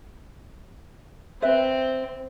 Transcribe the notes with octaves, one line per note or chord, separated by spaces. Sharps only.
C4 B4 E5